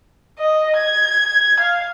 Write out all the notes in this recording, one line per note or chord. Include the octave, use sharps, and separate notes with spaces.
D#5
G#6
F5